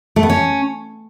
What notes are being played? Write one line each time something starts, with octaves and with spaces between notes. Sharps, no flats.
A3
B3
C#4